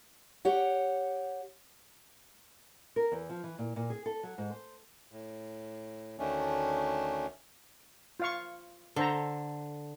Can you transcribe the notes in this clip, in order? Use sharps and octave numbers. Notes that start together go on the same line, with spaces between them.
G4 C#5 F#5
A#4
E2
F3
E3
A#2
A#2
G#4
A4
F#3
G#2
C5
A2
D2 D#3 A3 C#4 D4
F4 F5 C#6
D3 A4 C5 A#5